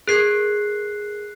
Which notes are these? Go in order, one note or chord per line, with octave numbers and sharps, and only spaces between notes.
G#4 A#4 F#6 G#6 C7